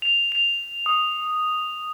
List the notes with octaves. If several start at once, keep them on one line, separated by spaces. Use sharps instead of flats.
F7
F7
D#6